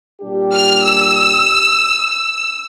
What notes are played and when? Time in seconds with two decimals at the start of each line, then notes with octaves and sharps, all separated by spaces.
0.21 A#2 G3 D4 G4
0.53 F6
0.84 E6
2.09 E6